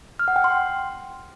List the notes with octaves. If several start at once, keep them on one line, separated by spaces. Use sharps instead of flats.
F6
F#5
G5
C6